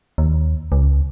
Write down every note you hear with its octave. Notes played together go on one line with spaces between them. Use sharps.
D#2
C#2